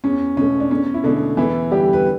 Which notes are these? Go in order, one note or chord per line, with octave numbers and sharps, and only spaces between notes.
E2 C#4
B2 A3 C#4
D4
E2 C#4
E4
B2 D3 A3 D4
E2 E3 E4
D3 G3 G4
B4